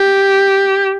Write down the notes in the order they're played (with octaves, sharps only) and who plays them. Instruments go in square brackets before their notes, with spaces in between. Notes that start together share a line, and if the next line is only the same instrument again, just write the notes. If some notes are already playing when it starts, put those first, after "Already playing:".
Already playing: [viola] G4